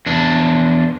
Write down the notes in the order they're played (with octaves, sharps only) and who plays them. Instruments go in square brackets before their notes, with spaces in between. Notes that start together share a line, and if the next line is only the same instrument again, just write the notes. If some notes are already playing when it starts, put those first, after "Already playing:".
[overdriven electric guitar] E2 D4